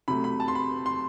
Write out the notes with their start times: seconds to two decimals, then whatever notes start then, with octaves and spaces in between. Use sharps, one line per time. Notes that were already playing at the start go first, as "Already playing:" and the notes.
0.08 C3 F#3 A3 B5
0.24 B5
0.40 A5
0.48 C6
0.55 B5
0.86 C6